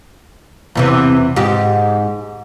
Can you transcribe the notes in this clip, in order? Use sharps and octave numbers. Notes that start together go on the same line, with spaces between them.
E2 C3 E3
G#2 G4